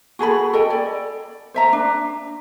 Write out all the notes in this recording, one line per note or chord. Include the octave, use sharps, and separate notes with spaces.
F#4 G#4 A4 B5
A4 D#5 G5
D5
C5 E5 A#5
D4